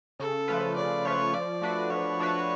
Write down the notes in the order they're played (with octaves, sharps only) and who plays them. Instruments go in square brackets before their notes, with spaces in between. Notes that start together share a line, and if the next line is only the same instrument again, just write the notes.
[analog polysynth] C#3 [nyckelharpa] A4
[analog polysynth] F3 A3 F4 B4
[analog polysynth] C#3 [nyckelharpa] D5
[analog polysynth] F3 A3 F4 B4 [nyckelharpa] C#5
[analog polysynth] F3 [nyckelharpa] D5
[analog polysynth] A3 D4 F#4 B4
[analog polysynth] F3 [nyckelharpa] C#5
[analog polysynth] A3 D4 F#4 B4